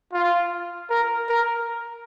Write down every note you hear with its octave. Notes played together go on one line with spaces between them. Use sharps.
F4
A#4
A#4